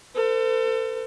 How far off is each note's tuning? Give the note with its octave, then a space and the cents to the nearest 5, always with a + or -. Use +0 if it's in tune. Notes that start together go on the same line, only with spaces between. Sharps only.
A4 +35 C5 -45